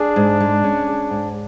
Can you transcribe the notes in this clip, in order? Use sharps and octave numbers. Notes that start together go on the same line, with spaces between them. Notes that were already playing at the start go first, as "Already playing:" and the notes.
Already playing: D4 G#4
G#2
G#3
C#4
G#4
G#2